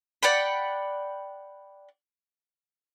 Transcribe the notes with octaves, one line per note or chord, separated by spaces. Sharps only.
D5 F#5 G5 B5